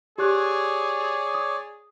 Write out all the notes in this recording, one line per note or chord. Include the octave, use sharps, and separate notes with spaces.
G4 G#4 C#5 D5 F#6
D#6